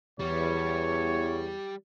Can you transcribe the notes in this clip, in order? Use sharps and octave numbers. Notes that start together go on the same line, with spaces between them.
E2 G3 C#5